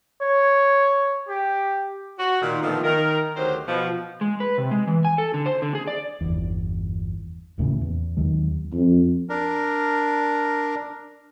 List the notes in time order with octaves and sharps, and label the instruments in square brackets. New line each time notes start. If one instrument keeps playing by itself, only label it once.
[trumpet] C#5
G4
[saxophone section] F#4
A#2 D#3
D3 D#3 F3 A3 B3 D#4
D#3 A#4
D2 D#3 F#3 G4 C5
B2 F3
[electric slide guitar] G#3
B4
C3
G#3
E3
G#5
A4
D3
C5
D3
G#4
D5
[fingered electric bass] G1 E2
E1 D#2 A2 C#3
E2
D#2 D#3 F#3 G#3
[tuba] F2
[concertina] D4 A#4